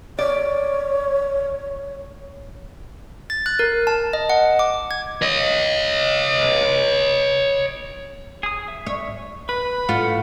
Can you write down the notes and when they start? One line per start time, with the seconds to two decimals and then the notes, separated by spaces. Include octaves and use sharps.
0.19 C#5 D5
3.30 A6
3.46 F#6
3.59 A#4
3.87 A5
4.13 D#5
4.30 F#5
4.59 D6
4.91 G#6
5.22 C#5 D#5
8.43 G#4 D#6
8.68 E5
8.87 C#5
9.49 B4 B5
9.89 A2 F4 F#5